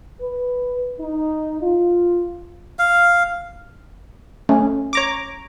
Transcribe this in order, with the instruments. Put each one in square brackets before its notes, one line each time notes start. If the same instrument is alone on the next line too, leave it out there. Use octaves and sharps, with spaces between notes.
[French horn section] B4
D#4
F4
[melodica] F5
[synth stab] A3 [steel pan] C#4
[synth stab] C#5 A#5 D6